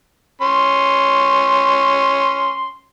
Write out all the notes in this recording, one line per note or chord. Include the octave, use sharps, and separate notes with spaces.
C#4 C6